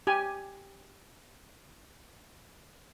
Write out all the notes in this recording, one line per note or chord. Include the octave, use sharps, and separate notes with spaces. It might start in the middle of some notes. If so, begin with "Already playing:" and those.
G4 G#5